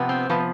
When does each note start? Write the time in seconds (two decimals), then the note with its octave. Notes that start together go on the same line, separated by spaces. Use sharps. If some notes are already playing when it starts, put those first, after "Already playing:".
Already playing: C3 F3 B3
0.09 C4
0.30 C3 F3 B3